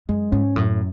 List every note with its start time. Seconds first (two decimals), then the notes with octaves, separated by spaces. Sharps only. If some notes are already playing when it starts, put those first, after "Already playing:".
0.09 F#2 G#3
0.32 G#2 C#4
0.56 F#2 A2